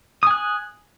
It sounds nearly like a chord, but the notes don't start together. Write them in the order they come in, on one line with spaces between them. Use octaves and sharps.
D#6 G#5 F#6